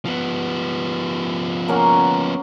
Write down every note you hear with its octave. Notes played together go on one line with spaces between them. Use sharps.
F3 B3
A#3 C#4 F#4